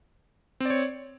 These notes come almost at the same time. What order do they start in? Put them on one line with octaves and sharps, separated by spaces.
C4 D5 C#5